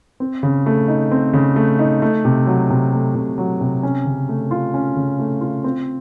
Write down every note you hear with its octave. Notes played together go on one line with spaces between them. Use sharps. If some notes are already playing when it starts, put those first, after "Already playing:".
C4
C#3
A3
D#4
C4
C#3
A3
D#4
A3
C3
F#3
C3
A3
C3
F#3
C3
C#4
C#3
A3
F4
C#4
C#3
A3
F4
C4